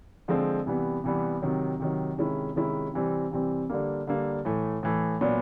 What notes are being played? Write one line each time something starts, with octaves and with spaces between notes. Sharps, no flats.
D3 F3 G#3 C4
C3 E3 G3 B3
C3 E3 G3 B3
C3 D#3 F#3
C3 D#3 F#3
C3 D#3 G#3 C#4 E4
C3 D#3 G#3 C#4 E4
C3 E3 G3 C4
C3 E3 G3 C4
D3 G3 A#3
D3 G3 A#3
A2 E3 A3
A2 E3 A3
A#2 F#3 B3 D4